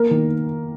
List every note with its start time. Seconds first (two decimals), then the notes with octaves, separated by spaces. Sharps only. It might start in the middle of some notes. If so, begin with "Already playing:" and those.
Already playing: A#3 A#4
0.11 D#3